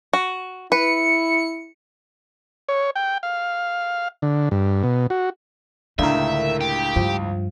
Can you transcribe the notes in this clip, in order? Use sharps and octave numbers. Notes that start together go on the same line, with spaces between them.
F#4
E4 B4 C#7
C#5
G5
F5
D3
G2
B2
F#4
C#2 A2 D3 D#4 A#4 E5
G4
G2 F3